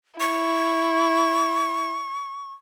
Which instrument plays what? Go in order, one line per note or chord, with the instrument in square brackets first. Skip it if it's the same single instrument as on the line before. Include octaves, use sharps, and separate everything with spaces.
[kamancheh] E4 [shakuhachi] C#6